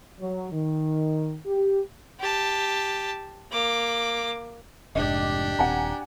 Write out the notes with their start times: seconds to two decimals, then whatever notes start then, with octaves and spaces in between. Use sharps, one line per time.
0.20 F#3
0.52 D#3
1.46 G4
2.20 G4 A5
3.51 A#3 D6
4.95 F1 G#2 D4 G4 D#5
5.59 D#1 C4 F#5 G#5 A#5